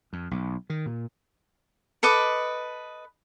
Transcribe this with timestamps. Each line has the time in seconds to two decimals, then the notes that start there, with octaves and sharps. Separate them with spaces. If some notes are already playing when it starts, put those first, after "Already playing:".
0.13 F2
0.31 B1
0.70 D#3
0.86 A#2
2.03 A4 B4 D#5 D6